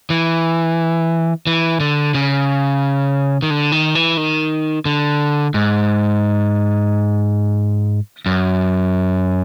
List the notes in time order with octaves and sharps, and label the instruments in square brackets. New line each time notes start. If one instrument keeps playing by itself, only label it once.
[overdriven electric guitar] E3
E3
D3
C#3
D#3
D3
D#3
E3
D#3
D3
G#2
F#2